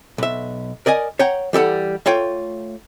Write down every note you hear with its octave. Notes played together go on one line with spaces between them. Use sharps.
B1 E5
A#4 D5 D#5 G#5
C#5 F#5 G5 A#5
E3 G3 A4 F#5
A3 F4 C#5 G5